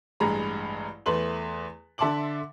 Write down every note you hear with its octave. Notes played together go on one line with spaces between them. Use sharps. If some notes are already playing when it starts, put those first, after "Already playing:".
A1 G2 G#3 G#4 A#5 B5
E2 A3 B4 C6 F#7
D3 E5 A5 C6 D6 F#7